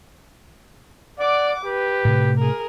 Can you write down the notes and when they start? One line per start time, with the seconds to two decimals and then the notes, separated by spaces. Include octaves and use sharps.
1.19 D5 F#5 D6
1.65 G4 B4
2.05 A2 C3 A3
2.38 G#4 A#4